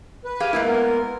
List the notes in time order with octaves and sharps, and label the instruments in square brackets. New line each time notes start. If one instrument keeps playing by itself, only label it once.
[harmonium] B4
[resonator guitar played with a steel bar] G4 G#4 F5
G#3 A#3 E4
[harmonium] B3 A#4